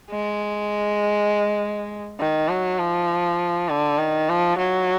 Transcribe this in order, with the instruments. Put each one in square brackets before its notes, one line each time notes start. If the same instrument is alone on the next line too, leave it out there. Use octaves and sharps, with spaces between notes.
[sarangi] G#3
D#3
F#3
F3
D3
D#3
F3
F#3